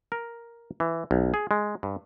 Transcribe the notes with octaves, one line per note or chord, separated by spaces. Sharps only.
A#4
E3
B1
G#4
G#3
G2